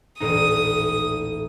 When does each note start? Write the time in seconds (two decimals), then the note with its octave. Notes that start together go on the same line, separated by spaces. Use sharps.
0.20 D#1 A1 D#4 D#6